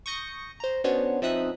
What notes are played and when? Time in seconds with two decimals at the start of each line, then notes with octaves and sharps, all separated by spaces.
0.06 C#6 D#6 G6 A#6 C#7
0.60 C5 A#5
0.84 B3 C#4 D4 F#4 C5 C#5
1.22 F3 C4 D#4 E5 D#6 F#6